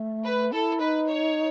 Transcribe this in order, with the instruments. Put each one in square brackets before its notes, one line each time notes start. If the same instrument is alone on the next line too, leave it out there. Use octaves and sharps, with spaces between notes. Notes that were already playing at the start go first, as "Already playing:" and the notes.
Already playing: [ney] A3
[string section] B4
[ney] E4 [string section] A4
[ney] D#4 [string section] B4
[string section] C#5